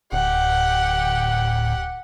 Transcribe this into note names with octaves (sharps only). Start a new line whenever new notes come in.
D1 G4 F#5